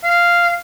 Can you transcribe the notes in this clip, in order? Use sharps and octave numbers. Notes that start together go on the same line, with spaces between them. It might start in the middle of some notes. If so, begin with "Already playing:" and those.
F5